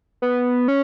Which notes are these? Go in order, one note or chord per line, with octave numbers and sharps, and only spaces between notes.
B3
C#4